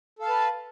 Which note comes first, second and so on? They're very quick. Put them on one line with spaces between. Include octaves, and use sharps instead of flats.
A4 F5 A5 B4